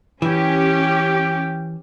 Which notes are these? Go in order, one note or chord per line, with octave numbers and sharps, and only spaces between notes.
E3 C#4 G4 G5